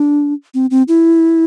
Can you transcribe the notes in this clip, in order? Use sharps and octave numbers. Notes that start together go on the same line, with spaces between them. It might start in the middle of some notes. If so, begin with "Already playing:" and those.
Already playing: D4
C4
C4
E4